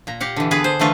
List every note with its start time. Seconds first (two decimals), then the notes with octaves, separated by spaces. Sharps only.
0.07 A#2 A#5
0.20 G4 F5 F#5
0.36 D3 E3
0.51 D3 B3 G#4 B4
0.64 C5
0.80 D3 E3 A3 F4 B4